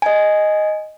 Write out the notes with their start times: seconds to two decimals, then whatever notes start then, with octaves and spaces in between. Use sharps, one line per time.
0.02 D#5 G#5